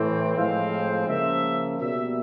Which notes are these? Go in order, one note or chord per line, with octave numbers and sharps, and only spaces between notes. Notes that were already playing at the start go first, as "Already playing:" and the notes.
Already playing: A2 E3 A3 C4
A2 F3 G#3 C4 F5
C#3 F3 A#3 E5
B2 G3 A#3 E5